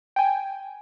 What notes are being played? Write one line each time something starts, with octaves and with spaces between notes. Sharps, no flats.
G5 G#5